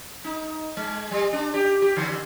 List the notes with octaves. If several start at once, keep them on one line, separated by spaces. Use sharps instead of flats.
D#4
G#3
G3
D4
G4
G4
D3